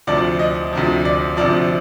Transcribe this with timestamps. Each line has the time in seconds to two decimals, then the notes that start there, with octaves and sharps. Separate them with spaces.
0.07 D2 C3 F3 D5
0.39 D#5
0.73 D2 C3 F3
1.05 D5
1.37 D2 C3 F3 D5